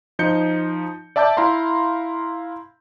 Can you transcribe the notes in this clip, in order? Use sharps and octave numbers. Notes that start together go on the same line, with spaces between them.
F3 D#4 G6 C#7
D5 E5 A5 D6 G6
E4 F5 A#5 C6